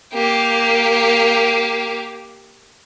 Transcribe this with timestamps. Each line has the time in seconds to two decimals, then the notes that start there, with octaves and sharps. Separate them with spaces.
0.14 A#3 G4